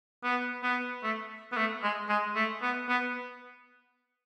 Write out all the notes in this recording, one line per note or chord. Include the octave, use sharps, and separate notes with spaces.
B3
B3
A3
B3
A3
G#3
G#3
A3
B3
B3